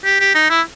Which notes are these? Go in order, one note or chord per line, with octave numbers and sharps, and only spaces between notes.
G4
G4
D#4
E4